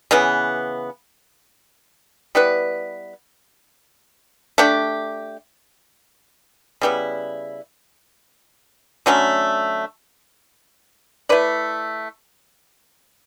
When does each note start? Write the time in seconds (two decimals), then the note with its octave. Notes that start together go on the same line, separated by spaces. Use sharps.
0.11 C#3 E3 B3
2.35 G3 B3 E4 B4
4.58 A3 D4 G4
6.81 C#3 G3 B3 E4
9.06 D3 F#3 A3 C#4
11.29 A3 E4 B4 D5